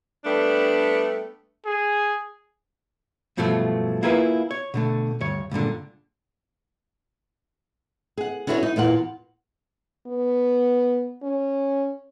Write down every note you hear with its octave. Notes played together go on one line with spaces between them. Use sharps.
G3 A3 B3 D4
G#4
G2 B2 F3 F#3 A3
A#3 E4 F4 G#4 A#4 B4
C#5
B2 D3 A3
D2 G2 C#5
C#2 G2 A#2 D3
G#4 F#5
C#4 D4 E4 F#4 B4 C#5
D#4
E2 A#2 F4 F#5
B3
C#4